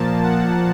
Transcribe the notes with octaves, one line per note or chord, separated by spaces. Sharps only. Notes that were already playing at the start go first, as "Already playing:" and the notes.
Already playing: A#2 F3 A#3 A5
F#5